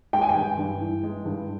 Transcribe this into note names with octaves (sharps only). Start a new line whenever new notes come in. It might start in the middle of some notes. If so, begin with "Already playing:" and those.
G#3 G5
G#5
G5
G2
G2
E3
G#3
G2